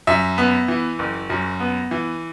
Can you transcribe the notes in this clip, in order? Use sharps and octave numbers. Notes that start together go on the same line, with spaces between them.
F#2 E5
B3
E3
F#1
F#2
B3
E3